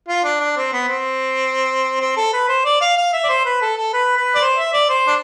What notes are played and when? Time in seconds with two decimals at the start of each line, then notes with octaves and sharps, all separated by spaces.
0.08 F4
0.24 D4
0.40 D4
0.57 C4
0.73 B3
0.89 C4
2.00 C4
2.17 A4
2.33 B4
2.49 C5
2.65 D5
2.81 F5
2.97 F5
3.13 E5
3.24 D5
3.29 C5
3.45 B4
3.62 A4
3.77 A4
3.93 B4
4.17 B4
4.35 D5
4.41 C5
4.57 E5
4.73 D5
4.89 C5
5.07 D4